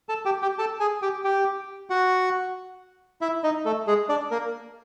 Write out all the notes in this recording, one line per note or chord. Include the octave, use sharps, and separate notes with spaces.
A4 A5
G4 G5
G4 G5
A4 A5
G#4 G#5
G4 G5
G4 G5
F#4 F#5
E4 E5
D#4 D#5
A3 A4
G#3 G#4
D4 D5
A#3 A#4